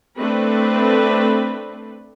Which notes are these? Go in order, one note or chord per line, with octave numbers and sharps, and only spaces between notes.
A3 C4 D4 B4